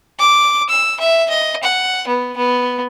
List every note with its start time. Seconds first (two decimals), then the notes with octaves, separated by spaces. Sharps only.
0.19 D6
0.69 E6
1.00 E5
1.30 D#5
1.63 F#5
2.07 B3
2.37 B3